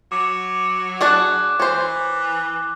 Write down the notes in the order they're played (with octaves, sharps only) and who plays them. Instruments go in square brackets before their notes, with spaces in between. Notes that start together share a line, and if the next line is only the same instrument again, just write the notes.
[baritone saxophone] F#3 [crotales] D6
[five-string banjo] D4 F#4 G#4 [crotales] D6 F#6
[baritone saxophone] E3 [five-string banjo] C5 C#5